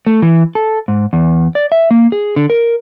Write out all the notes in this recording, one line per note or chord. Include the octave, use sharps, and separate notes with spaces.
A3
E3
A4
G#2
E2
D5
E5
A#3
G#4
D3
A#4